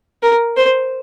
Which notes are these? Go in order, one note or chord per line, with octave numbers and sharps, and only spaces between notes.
A#4
C5